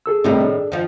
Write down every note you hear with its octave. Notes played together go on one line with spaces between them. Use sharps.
G#4 A4 E6
A2 C3 D#3 G3 A3 A#3
D4
D#3 F3